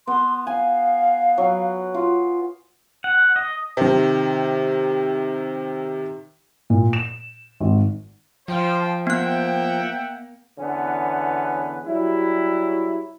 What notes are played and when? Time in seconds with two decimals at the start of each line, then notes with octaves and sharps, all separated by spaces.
0.07 B3 C6
0.47 F5 G#5
1.38 F#3
1.94 F4
3.04 F#5
3.36 D#5
3.77 C3 D#3
6.70 A#2
6.93 E7
7.60 G#1
8.48 F3 C5 F5 G5
9.07 A#3 B3 E5 F#5 G5 F#6
10.59 E2 D3 B3 C#4 B4
11.87 F#3 G3 E4